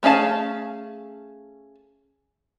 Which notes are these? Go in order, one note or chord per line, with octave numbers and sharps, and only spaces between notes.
A3 C#4 G#4 F5 A5